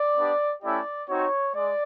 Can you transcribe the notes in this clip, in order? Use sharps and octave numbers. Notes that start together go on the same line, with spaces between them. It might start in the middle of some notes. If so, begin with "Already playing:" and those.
Already playing: D5
B3 D4 G4
A3 C#4 E4 G4 D5
C4 D#4 F#4 C#5
G#3 D5